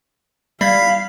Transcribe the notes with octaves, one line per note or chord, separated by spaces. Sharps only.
G3 F5 B5 G#6 B6 C7